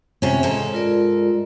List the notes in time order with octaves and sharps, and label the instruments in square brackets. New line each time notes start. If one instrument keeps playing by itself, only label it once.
[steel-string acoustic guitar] C3 C#4
G#2 A4
[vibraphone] F4 A#4 D5